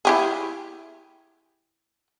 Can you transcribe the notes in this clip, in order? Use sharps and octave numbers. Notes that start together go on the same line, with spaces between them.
E4 G4 G#4